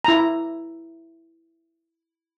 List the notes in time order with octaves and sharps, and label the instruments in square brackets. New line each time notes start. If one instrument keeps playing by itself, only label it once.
[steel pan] E4 A#5